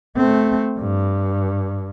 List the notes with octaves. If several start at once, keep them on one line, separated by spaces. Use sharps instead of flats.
A3 C4
G2